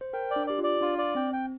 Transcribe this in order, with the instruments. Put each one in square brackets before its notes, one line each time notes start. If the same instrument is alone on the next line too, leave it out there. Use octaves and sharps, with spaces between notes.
[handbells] C5
[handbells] A#4 [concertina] G5
[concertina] D5
[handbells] D4
[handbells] G4 [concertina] D5
[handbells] F4 [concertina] D5
[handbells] D4 [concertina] F4
[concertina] D5
[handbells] C4 [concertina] G5
[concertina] G5